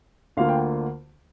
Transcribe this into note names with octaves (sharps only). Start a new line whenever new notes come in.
D2 D3 A#3 F4 F5
G5